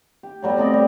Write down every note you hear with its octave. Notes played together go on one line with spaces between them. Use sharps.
G4
A2 F#3 G3 B3
C3 C4 D5 D#5
G3